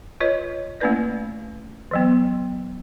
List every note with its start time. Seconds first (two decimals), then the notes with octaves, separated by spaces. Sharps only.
0.20 F4 B4 C#5 D#5
0.80 A3 A#3 C#4 E4 B4 D5
1.91 E3 F#3 B3